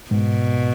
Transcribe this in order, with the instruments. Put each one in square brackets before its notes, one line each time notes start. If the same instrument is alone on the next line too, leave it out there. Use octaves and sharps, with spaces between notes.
[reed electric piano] G#2 [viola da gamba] B2